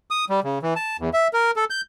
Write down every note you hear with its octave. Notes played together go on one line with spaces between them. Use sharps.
D#6
G3
C#3
E3
A5
E2
E5
A#4
A4
G6